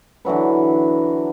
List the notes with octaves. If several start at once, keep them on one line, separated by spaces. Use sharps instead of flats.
D3 E3 F#3 B4